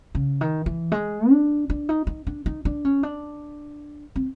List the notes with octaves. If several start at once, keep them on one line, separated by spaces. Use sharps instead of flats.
C#3
D#3
E3
G#3
D4
D4
D#4
D#4
D4
D#4
D4
C#4
D4
C4